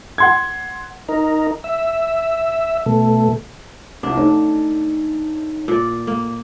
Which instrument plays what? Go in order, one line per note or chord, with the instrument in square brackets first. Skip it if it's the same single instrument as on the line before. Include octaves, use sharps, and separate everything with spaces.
[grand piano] F#5 C6 G#6
[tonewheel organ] D#4 A#4
E5
B2 A3
[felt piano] C2 C3 F3 [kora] D4
[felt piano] A3 C#4 [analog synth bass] D#4
[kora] A#2 D5
A#3